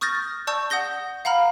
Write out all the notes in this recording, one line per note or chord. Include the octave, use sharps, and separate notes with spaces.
C#6 D#6 F6 G6 A6 A#6
D5 A5 C#6 E6 G6
F#5 D#6 G6 A#6 G7
F5 F#5 A#5 B5 F6